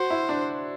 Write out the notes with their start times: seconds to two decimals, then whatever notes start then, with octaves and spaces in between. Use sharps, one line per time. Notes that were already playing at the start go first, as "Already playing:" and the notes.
Already playing: F#4 C5
0.10 E4
0.29 D4